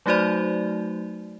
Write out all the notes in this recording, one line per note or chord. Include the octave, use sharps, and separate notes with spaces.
F#3 A3 D#4 F#4 C5 D5